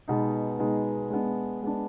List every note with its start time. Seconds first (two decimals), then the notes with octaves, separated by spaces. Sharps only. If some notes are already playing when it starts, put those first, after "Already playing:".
0.08 B2 G#3 B3 D#4
0.59 B2 G#3 B3 D#4
1.10 G#3 B3 D4
1.62 G#3 B3 D4